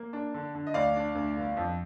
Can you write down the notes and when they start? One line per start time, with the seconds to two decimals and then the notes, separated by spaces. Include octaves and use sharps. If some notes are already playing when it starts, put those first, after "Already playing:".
Already playing: A#3
0.13 D4
0.34 D3
0.55 D3
0.67 D#5
0.74 D2 D5 F5
0.96 D4
1.15 D2
1.36 G1
1.57 F2